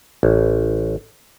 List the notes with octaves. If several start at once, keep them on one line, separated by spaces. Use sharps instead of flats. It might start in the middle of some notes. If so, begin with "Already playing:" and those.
A1